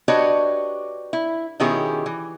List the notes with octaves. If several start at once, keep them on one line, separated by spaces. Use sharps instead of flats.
D4 F#4 G4 B4 C#5 D#5
E4
B2 D#3 C#4 E4 G4 G#4
E3